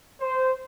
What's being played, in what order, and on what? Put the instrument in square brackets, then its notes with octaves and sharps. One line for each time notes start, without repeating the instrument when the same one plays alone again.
[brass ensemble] C5